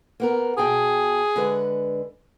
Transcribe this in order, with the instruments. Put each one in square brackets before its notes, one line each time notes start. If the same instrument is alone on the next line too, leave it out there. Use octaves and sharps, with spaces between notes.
[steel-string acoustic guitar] A#3 B3 A#4
[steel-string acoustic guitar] B2 G5 A5 [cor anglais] G#4
[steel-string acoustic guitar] D3 G#3 B4